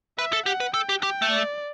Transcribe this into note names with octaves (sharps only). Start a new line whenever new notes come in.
B4 E5
A4
G4 F#5
B4
A4 G5
G4
G4 G5
A3
D5